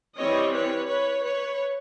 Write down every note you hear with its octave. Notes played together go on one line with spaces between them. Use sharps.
E3 G3 C4 C#5 D#5
B4 C#5
B4 C#5
B4 C#5